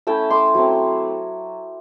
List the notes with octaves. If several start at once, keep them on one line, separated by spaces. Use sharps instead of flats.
A3 C#4 E4 G5 A5
C6 D6
F#3 A3 C4